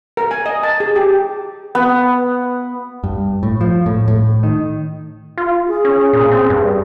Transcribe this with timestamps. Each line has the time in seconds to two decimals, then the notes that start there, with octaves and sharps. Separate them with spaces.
0.17 A#4
0.31 G#5
0.46 D#5
0.63 A5
0.80 G#4
0.96 G4
1.75 B3
3.04 G2
3.43 A2
3.61 F3
3.86 A2
4.08 A2
4.43 D#3
5.38 F4
5.68 G#4
5.85 C#4
6.13 A#2
6.31 C4
6.50 G2